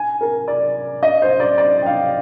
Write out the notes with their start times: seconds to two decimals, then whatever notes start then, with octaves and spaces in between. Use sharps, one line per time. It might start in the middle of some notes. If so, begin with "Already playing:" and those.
Already playing: G#5
0.21 A#4
0.48 D5
1.03 D#5
1.22 C5
1.40 D5
1.58 D5
1.82 G5
1.86 F5